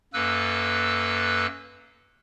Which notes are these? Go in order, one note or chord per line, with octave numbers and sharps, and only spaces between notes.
F#2 A#3 A4 B4 E6 F#6